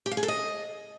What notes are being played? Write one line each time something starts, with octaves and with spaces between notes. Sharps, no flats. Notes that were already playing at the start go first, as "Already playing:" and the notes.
G4
F5
G#4
A4
D#5